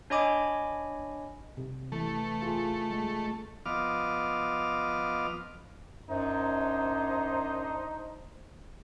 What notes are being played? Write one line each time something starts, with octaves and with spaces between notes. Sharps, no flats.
D4 C#5 D#5 G#5 B5 D6
C3
E3 A3
F4 G#4
G#3
F3 B3 D#5 D6 F6
F#2 D4 D#4 C5